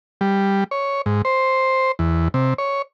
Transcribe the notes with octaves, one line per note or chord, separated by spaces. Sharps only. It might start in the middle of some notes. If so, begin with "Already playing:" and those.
G3
C#5
G#2
C5
E2
C3
C#5